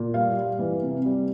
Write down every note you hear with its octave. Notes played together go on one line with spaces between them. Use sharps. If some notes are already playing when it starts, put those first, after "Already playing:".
Already playing: A#2
G3 F5
G3
E3
C3
G3